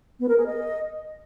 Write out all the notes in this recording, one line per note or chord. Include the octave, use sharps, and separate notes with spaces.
B3
A#4
G#4
D#5